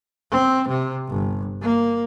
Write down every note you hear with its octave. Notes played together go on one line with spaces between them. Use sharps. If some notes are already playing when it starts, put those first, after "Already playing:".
C4
C3
G1
A#3